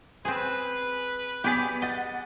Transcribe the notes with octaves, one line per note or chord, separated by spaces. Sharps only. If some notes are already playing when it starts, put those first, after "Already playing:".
C4 G#4 B4
B3 G4 G#4 D5 B5 B6
D#5 F#5 A6